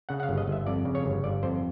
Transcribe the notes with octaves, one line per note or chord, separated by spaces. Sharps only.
C#3 F#5
F#5
F5
G1
D#5
G1 E5
F2 D5
C#3
C#5
G1
G1 D5
F2 C5